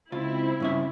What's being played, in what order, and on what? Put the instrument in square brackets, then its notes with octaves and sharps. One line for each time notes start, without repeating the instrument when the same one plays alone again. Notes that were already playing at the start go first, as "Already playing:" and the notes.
[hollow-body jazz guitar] C#2 F4 [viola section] C4 E4
[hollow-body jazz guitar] G2 C#3 E5